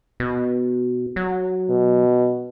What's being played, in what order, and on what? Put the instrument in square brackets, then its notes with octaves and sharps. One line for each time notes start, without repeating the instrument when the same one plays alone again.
[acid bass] B2
F#3
[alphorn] B2